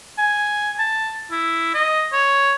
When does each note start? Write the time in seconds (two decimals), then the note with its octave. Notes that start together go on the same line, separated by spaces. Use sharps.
0.18 G#5
0.79 A5
1.31 E4
1.74 D#5
2.12 C#5